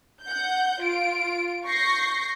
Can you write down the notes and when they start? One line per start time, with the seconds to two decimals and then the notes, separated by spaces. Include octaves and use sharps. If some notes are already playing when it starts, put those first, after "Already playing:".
0.24 F#5 G6
0.83 F4 D7
1.65 C#6 G6 A#6 C7